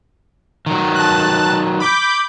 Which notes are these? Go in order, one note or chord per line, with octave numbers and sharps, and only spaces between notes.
D#3 F#3
A5 F#6
B5 D6 G6